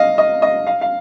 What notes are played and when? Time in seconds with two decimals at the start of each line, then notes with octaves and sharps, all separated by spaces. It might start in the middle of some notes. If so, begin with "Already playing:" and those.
Already playing: D#5 F5
0.18 D#5
0.42 D#5
0.67 F5
0.81 F5